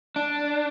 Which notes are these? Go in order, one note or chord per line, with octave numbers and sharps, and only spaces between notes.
D4